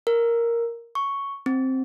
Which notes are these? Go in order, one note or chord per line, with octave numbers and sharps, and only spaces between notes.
A#4
C#6
C4